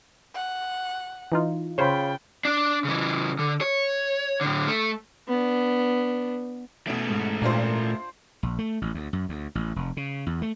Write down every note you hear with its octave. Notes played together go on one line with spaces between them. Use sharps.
F#5
E3 D#4 F4
C#3 F4 C5 C#5 G5 B5
D4
C#3 E3
D3
C#5
A2 D3
A3
B3 D4
B2 A3 C#4 D7
G#2
A#2 D4 F4 C5
A#1
A3
A1
D2
F#2
D2
A1
F1
C#3
E2
A3